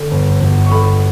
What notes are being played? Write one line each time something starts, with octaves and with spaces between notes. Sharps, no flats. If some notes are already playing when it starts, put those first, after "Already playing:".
Already playing: D3
G1
G1
C#6
D3 B5